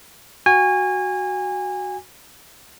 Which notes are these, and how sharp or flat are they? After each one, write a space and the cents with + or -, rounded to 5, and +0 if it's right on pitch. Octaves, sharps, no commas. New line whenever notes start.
F#4 +0 G#5 -25